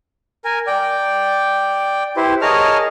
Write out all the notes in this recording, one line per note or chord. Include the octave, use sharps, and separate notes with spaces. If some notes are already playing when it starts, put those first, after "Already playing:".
A#4 G#5
D5 G5
E4 G4 B4 C5
G#4 A#4 C#5 D#5 A5 F6